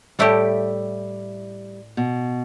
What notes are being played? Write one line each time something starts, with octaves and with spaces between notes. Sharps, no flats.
A2 G3 A3 E4 G4
B2